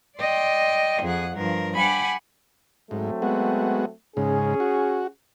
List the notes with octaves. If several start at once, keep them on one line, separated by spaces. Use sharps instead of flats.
D5 D#5 G5 C6
F2 G#4 F#5
G2 F3 A#4
G4 F#5 G#5 B5
G#2 F#3 A3 C4
G#3 B3 F#4
G#2 C#3 C#4 G#4
F#4